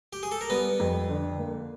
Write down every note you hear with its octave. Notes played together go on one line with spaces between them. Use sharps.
G4
G#4
A4
A#4
G3 B3 B4
F2
D3
A#3